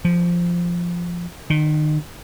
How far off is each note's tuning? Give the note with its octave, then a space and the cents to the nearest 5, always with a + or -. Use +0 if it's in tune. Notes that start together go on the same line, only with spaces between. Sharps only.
F3 -5
D#3 -35